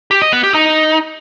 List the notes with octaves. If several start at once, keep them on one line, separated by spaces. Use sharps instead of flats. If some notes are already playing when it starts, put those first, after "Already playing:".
G4
D#5
B3
G4
D#4